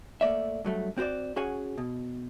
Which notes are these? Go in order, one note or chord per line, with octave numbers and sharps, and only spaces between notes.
A3 A#3 D5 E5
G2 F#3 A3
C4 F#4 G4 C5 D5
C#4 F#4 G#4 C#5 F#5 G#5
B2